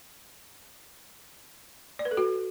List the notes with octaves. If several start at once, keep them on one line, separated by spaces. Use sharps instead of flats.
D5
B4
A4
F#4